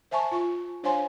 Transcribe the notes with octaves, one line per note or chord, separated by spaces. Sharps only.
C5 E5 G#5 A5 C#6
F4 C#6
D4 C5 C#5 F5 G#5 C6